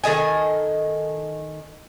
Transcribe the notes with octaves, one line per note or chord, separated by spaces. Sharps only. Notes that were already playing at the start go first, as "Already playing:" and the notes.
D#3 A4 D#5 G#5